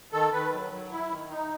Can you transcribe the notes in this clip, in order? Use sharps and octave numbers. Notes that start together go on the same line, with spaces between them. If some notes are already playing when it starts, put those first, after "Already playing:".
D#3 A4
D#3 B4
F#3
F#3
E4
D#3
D#4